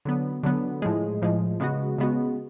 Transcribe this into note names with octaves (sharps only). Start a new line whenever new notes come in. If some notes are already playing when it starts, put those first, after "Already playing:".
D3 F#3 B3
D3 F#3 B3
A2 F3 G#3
A2 F3 G#3
C#3 G#3 B3 F#4
C#3 G#3 B3 F#4